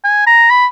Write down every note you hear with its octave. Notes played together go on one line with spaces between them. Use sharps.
G#5
A#5
B5